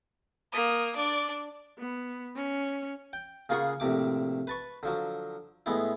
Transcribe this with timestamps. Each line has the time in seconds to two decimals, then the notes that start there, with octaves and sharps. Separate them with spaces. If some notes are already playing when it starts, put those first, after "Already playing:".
0.53 A#3 D#6
0.96 D4 D5
1.78 B3
2.35 C#4
3.13 G5
3.49 C#3 A#3 F4 G#4 F#5 C#6
3.80 A#1 A2 C3 D6
4.47 B4 A5 C#6
4.83 D3 F3 F#3
5.66 A2 G#3 B3 E4